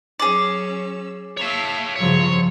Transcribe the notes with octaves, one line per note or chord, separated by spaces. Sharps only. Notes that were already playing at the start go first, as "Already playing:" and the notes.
F#3 C#4 G#4 D5 E6
C#5 E5 F5 A5 C#6
G2 C#3 F3 F#3 F4 C#5